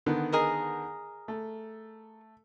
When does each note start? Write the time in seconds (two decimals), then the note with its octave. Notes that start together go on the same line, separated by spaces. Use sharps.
0.06 D3 D#3 B3
0.32 G#4 A#4 D#5
1.28 A3